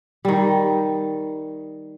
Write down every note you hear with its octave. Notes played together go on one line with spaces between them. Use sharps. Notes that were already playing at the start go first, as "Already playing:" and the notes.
D#3 G3